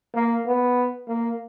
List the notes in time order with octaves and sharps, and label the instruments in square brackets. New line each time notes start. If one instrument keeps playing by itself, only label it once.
[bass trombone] A#3
B3
A#3